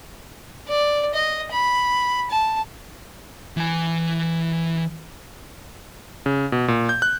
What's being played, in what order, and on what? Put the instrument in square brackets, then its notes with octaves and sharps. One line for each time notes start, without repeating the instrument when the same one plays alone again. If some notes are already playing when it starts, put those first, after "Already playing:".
[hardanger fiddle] D5
D#5
B5
A5
[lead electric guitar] E3 G#5
[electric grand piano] C#3
B2
A#2
G6
F#6